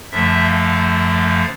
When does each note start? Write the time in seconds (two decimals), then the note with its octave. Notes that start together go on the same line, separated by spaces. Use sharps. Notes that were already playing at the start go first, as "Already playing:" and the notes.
0.11 F#2 D3 F3 A3 E5
0.44 F5
1.10 F5